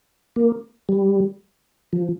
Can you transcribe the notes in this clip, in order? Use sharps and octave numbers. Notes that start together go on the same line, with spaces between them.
A#3
G3
F3